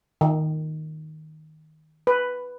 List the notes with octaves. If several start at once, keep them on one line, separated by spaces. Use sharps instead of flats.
D#3
B4